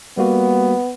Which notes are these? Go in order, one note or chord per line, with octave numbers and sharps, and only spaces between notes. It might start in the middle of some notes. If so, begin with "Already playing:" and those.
G3 A#3 B3 F#4